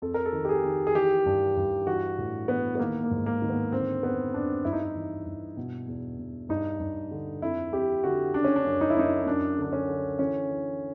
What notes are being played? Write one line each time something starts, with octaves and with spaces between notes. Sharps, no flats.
F2 A4
A#4
A4
D#3
G4
G#4
D#3
G#4
E3 G4
G2
G2
E3 F#4
A2
E3 B3
B3
D#3 A#3
A#3
G#2
A#3
D#3
B3
D3 C4
F2 B3
F2 D4
G2 E4
D#4
E4
E3
G2
B2
E2
B2
G2 D#4
G2
D3
F2 E4
F2 G4
D3 F#4
C#3 D4
C#4
D4
F#2
D#4
E4
F#2 D#4
F#2 D4
D3 D4
C#4
D3
E3 C#4
E3